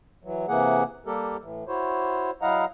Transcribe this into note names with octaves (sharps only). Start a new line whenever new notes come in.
E3 F#3
C3 E3 A#3 G#4 F#5
G3 A#3 G4 A4 A#4
A2 E3
E4 F#4 C5 C#5
F#3 E4 D#5 F5 F#5 A#5